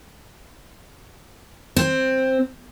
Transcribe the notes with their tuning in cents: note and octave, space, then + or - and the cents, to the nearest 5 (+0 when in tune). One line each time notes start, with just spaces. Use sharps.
C4 +5